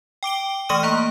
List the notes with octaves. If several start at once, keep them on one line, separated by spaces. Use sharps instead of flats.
G5 D6 D7 G7
E3 A3 C#6 D#6 F6 D#7
A#3 A#5